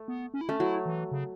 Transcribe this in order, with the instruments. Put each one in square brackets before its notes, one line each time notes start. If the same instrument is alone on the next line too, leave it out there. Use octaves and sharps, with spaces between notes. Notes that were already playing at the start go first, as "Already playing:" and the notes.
Already playing: [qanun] A3
[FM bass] B3
C#4
E4
[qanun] A3 [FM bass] C#4
[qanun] F#3 [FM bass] E4
[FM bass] E3
C#3